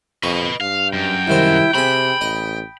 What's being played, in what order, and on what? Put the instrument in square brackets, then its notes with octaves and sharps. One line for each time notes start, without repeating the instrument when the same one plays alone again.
[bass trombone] F2 [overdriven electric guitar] B4 D#5 [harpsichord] C#6
[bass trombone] G2 [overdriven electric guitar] F5
[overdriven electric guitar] F#2 [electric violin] G5
[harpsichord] C2 D#3 C5 [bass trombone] E4
[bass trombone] C3 [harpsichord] C4 G#4 [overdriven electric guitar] B5
[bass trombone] A1 [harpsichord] D#5